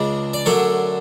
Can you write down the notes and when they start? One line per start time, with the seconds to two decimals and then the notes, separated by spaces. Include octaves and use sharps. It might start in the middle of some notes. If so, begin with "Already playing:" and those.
Already playing: C#2 C#3 G#3 D4
0.34 D5
0.46 F#2 D3 A3 D4 C#5